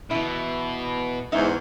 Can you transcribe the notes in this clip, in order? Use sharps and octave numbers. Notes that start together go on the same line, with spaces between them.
B2 E3 E4
E2 G#2 D#4 E5